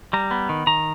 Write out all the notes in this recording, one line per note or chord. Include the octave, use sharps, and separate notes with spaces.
G3 A#5
B3
D#3
D#3 A#5